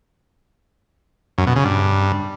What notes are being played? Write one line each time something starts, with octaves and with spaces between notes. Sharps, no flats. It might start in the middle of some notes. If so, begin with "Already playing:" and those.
F#2
B2
C#3
G2